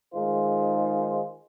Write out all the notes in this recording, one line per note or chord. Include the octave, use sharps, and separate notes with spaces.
D#3 G#3 D#4 F4 G#4 C5